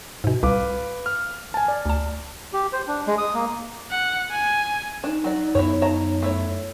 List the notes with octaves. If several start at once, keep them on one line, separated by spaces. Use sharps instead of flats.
G#2 B2
C2 B4 F5 D6
F6
G#5 A5
D5
D2 A5
G4
C5
D4
G#3
D#6
A#3
F#5
G#5
D4 D#4
F#3 D5
F#2 B3 E4 A4 C#5
C#5 A5 A#5
A3 E4 C#5